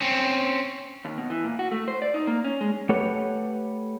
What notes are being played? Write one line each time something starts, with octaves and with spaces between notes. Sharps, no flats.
C4 C#4
D#2
B2
E3
A#2
F#4
A3
C5
D5
D#4
A#3
C#4
G#3
A3 G4 A4 B4 C#5 F#5